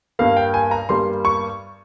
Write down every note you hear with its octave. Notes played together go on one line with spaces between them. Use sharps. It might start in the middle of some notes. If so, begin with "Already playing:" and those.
G2 G3 A#3 F5
G5
G#5
A#5
G2 G3 A#3 C6
C#6